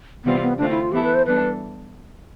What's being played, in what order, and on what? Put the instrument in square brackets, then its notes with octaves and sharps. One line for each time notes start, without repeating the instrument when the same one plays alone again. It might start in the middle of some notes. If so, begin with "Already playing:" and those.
[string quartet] C3 E3 G3 C4 F4 [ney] B3
[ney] B3
[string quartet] D3 A3 C4 F4 [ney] D4
[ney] E4
F4
[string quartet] E3 B3 E4 A4 [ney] G4
[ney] B4
C5
[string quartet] E3 G3 B3 D4 A4 [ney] B4